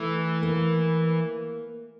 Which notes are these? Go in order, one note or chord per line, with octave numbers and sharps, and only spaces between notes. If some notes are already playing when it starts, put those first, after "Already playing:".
Already playing: E3 A3
A#3